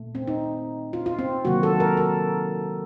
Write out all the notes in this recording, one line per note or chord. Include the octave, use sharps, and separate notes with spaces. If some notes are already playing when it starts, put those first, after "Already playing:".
Already playing: A#2 A3
C4
D#4
F4
F4
C4
C3 D#3 F#3 A#3 F#4
A4
A#4
A4